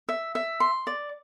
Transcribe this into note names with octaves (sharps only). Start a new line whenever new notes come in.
E5
E5
C6
D5